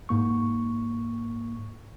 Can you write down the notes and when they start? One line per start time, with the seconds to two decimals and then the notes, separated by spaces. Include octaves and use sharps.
0.09 G#2 A#3 C#6